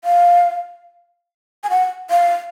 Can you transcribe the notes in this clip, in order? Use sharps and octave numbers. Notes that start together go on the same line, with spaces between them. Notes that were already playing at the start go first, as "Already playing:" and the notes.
F5
G#5
F#5
F5